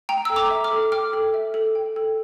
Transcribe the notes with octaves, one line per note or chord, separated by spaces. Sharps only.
G5 A#5
A4 E6
A#5 D6
E5
D6 F6
A4
G5 D6 F6
A4
E5
A4
G5
A4